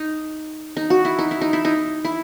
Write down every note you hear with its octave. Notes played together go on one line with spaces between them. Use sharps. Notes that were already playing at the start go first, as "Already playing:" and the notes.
Already playing: D#4
D#4
F#4
E4
D#4
E4
D#4
E4
D#4
E4